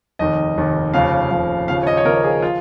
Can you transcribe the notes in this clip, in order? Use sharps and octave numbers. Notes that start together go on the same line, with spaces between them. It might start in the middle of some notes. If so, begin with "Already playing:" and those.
F1 D#2 D#3 D#5
F1 D#2 D#3
F1 D#2 C#3 F3 F5
F1 D#2 C#3 F3
D#2 C#3 F3 F5
C#5
D#5
C#5
D#2 C#3 F3 A#4
G#4
F3 F4